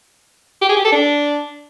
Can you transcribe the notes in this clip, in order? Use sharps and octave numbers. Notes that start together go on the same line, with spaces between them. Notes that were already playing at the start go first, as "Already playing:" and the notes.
G4
G#4
G4
A4
D4